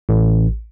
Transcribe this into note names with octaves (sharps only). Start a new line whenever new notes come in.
A1